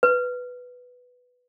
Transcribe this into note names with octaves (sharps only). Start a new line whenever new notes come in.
B4